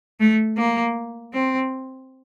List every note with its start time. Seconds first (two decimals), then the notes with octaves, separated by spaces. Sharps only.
0.20 A3
0.57 A#3
1.34 C4